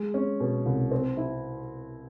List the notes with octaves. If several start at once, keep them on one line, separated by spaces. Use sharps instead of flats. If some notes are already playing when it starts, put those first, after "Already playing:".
Already playing: G#3
C#4
B2
C2
C4
E4